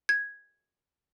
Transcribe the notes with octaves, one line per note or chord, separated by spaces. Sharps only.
G#6